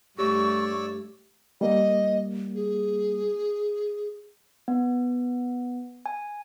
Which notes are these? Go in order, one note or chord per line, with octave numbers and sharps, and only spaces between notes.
G2 A3 G4 C#5 D5 C#6 E6
G3 A#3 D#5
G#4
B3
G#5